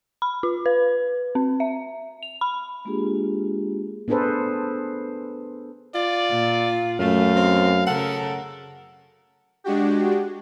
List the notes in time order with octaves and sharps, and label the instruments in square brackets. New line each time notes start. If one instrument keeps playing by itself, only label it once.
[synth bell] B5
F4
B4
C4
E5
F7
B5
[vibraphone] G#3 A#3 D4 F4 G4 G#4
[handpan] B3 D4 G#4 A4 B4 C5
[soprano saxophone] F4 [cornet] D5
[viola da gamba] A#2
[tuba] F#2 [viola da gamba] A3 [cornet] F5
[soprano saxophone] C4
[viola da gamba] C#3 A#4 [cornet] A4 [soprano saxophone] F#5
[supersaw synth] G#3 D4 F#4 G4